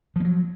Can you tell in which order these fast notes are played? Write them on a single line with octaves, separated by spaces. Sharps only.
F3 A#3 F#3